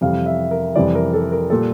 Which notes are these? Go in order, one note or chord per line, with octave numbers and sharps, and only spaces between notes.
F2 C3 E3 G3 F5
E5
A#4
F2 C3 E3 G3 D5
A#4
A4
A#4
A#2 G3 A4